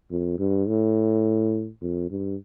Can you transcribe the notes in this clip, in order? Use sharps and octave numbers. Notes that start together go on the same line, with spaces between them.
F2
G2
A2
F2
G2